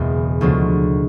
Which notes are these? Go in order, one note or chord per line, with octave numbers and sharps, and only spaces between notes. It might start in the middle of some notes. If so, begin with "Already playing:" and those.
Already playing: F#1 E2 B2 G#3 B3
D2 C#3 F3 G#3 B3